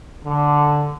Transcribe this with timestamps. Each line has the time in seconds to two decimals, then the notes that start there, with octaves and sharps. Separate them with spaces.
0.25 D3